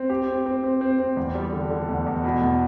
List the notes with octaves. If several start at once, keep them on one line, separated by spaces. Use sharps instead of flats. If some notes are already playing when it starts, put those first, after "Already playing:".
Already playing: C4
G4
C4
C4
C4
C4
C4
E2
G3
D3
D3
E2
E2
B2
E2